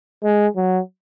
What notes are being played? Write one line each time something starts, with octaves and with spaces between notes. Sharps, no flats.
G#3
F#3